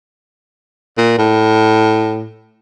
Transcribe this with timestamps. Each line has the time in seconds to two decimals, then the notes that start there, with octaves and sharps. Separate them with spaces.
0.98 A#2
1.18 A2